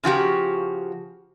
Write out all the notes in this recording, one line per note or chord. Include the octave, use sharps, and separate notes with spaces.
C#3 F3 F#4 G4